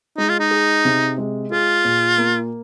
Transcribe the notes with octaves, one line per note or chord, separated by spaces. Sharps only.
G#3 D#4
F4
D#4
G#4
C3
G#3
F4 G#4
A#2
A#3